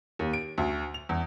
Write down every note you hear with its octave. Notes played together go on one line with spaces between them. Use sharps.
D#2
D7
D2
F7
E2